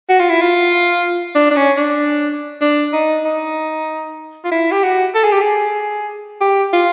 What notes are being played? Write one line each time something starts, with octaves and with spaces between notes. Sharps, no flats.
F#4
F4
E4
F4
D4
D4
C#4
D4
D4
D#4
D#4
F4
E4
G4
F#4
A4
G#4
G4
G#4
G4
F4